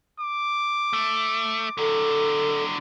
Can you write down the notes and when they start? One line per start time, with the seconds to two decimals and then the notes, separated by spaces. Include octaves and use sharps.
0.20 D6
0.93 A3
1.78 D3 F#3 A4